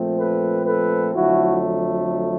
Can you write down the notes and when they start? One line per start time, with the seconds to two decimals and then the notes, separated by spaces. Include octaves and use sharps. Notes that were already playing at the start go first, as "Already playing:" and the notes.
Already playing: A#2 F3 A3 C4
0.17 A4 B4
0.66 A4 B4
1.15 F2 D3 F#3 A3 E4 F#4